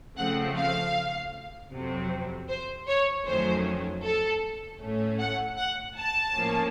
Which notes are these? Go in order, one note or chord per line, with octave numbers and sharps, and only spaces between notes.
C#3 F3 A3 C4 F#5
F5
F2 C3 F#3 C4
C5
C#5
F2 D#3 F#3 A3 C#4 C5
A4
A2 A3 C#4
F#5
F#5
A5
A2 F3 A#3 C#4